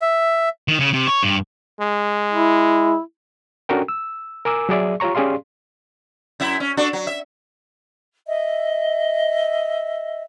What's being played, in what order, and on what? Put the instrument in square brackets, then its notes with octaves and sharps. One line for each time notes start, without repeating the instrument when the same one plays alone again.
[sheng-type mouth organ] E5
[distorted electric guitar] D#3
C#3
C3
C#5
G2
[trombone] G#3
[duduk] E4
[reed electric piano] C#4 D4 F#4 A4 A#4 G5
E6
A#4 G#5 D6 E6
F#3 G#4 D5 E5
F4 G4 C#5 A#5 C#6
C#4 G4 G#4 D5 F5 C6
[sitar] F#2 E4 E5
C#4
D4 F#4 A4
F#3
E5
[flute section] D#5 E5